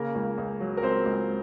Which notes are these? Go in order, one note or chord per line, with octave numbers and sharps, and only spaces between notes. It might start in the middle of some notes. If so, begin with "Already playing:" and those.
Already playing: C#3 A#3 A#4
C#2
C#2
F#3
A#4
C#2 C4 C5
C#2